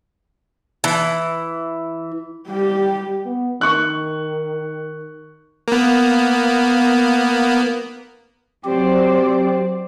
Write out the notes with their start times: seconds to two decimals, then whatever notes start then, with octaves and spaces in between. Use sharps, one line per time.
0.84 E3
2.47 G3 G4
3.25 B3
3.61 D#3 C#6 F#6
5.68 A#3 B3
8.65 F#3 C4 G4 C5 D5